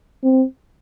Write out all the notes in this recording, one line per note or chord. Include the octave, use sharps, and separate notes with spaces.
C4